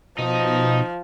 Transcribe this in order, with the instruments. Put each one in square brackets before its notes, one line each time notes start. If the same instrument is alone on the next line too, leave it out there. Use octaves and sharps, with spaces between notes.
[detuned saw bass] B2 [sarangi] F3 [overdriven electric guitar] D#4